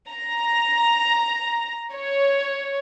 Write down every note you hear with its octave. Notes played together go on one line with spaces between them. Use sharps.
A#5
C#5